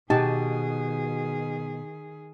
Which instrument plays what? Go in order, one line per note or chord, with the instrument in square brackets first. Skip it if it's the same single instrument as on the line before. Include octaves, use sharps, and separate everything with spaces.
[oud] B2 [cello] D#3 G#4 [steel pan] D#4 G4 A5